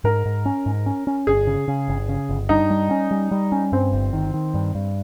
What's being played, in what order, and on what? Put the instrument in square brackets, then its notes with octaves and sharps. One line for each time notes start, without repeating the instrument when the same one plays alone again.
[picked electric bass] G#2 [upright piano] A#4
[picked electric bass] G#2
C#4
G#2
C#4
C#4
[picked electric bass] G1 [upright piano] G#4
[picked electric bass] C#3
C#3
G1
C#3
G1
[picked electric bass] G2 [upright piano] D#4
[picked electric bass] G3
C#4
G3
G3
C#4
[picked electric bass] G2 [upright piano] C4
[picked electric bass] G1
D#3
D#3
G2
G2